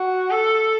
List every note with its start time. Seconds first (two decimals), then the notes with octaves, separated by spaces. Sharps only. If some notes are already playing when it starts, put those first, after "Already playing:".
Already playing: F#4
0.31 A4